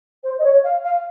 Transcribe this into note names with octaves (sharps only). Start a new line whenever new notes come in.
C5
D#5
C#5
F5
F5